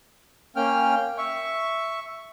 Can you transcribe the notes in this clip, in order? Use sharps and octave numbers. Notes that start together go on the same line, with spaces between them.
A#3 C#4 G5 F6
E5 C#6